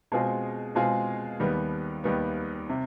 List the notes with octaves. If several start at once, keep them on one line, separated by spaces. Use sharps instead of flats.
B2 G#3 C4 F4 G#4
B2 G#3 C4 F4 G#4
D#2 D#3 G3 B3
D#2 D#3 G3 B3
C3